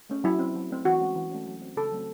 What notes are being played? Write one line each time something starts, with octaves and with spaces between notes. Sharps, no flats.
A3 C#4
F#3 E4
C4
F#3
A3 C4
E3 F#4
G#3 C#4
E3
A3 C#4
F#3
C4
C#3 A4
F#3 A3 C4